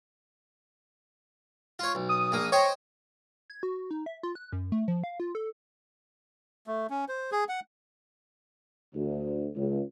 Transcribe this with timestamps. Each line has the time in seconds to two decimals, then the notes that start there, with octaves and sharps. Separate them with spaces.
1.79 F4 C#5
1.95 B1
2.09 D#6
2.32 A#1 A#3
2.52 C5 C#5 D#5 G5
3.50 G#6
3.63 F#4
3.91 D#4
4.06 E5
4.23 F4
4.35 F#6
4.53 F#2
4.72 A3
4.88 F3
5.04 F5
5.20 F4
5.35 A4
6.67 A3
6.90 C#4
7.08 C5
7.32 G#4
7.49 F#5
8.94 D2
9.56 C#2